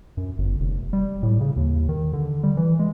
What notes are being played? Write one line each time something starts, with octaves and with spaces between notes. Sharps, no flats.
F#2
G1
F1
G3
A2
C#3
D#2
D#3
D3
G3
E3
G#3